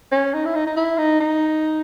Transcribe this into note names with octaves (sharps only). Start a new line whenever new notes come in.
C#4
D#4
E4
D#4
D#4
E4
D#4
D#4